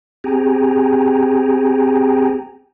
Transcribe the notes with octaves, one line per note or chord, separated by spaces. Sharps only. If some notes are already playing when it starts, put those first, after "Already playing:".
C4 G4 G#4 G5 G#5 A#5